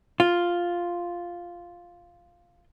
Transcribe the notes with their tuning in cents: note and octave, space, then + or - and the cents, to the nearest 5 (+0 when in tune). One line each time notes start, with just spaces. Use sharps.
F4 +0